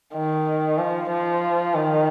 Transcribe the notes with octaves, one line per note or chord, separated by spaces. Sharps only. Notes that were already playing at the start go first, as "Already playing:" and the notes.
D#3
F3
F3
D#3